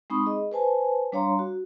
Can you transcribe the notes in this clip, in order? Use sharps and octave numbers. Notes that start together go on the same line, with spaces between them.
G#3 C4 D#4 B5 C#6 D#6
G#4 D#5
B4 C5 G#5 A5
G3 D4 C#5 F5 A#5 C6
F#4